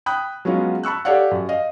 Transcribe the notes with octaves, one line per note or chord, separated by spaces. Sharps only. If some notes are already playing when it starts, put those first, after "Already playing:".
G5 B5 D#6 F#6
F#3 G#3 B3 C#4 F4
A5 B5 C#6 E6 F#6
G4 A4 C#5 D5 F5 F#5
F#2
D#5 F5